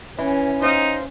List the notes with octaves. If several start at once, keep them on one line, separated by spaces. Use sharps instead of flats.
E3 C#4
D#4 C5 F5